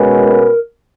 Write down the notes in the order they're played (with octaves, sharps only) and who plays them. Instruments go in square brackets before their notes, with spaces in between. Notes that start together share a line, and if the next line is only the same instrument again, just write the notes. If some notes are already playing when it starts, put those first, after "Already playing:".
Already playing: [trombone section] B2 G#3 C#4 F#4 B4 [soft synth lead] A#4